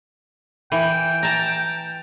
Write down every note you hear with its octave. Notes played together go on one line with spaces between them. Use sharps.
E3 G5
A5 A#5